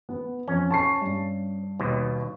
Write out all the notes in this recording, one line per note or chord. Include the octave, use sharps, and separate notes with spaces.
B3
F2 C#4
A5 C#6 C7
G2
D#2 B2